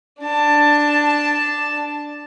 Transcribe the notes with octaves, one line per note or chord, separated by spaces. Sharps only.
D4 A5